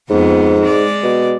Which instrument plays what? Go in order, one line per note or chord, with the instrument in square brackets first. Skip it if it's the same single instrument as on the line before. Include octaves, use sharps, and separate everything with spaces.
[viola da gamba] F2 B3 [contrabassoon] G#2
[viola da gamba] G#3 D5
[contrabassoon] B2